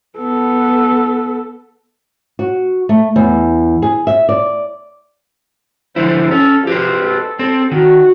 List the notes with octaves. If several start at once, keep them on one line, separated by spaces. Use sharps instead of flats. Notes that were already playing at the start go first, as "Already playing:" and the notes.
B3 A4
F#4
A3
E2
G#4
E5
D5
D3 F3 E4 C5
C#4 A4
F3 G4 B4 C5
A4
C4 A4
D#3 F#4